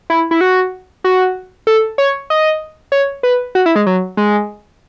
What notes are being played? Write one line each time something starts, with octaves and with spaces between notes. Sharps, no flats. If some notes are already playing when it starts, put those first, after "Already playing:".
E4
E4
F#4
F#4
A4
C#5
D#5
C#5
B4
F#4
E4
G#3
F#3
G#3